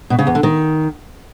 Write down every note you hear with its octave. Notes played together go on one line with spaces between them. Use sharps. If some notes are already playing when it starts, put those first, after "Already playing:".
B2
C#3
E2
D3
D#3